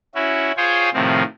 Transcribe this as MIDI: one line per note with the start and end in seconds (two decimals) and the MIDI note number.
0.15 0.52 61
0.15 0.52 64
0.15 0.52 66
0.57 0.90 65
0.57 0.90 68
0.57 0.90 72
0.57 0.90 73
0.57 0.90 79
0.57 0.90 80
0.93 1.23 45
0.93 1.23 48
0.93 1.23 51
0.93 1.23 53
0.93 1.23 60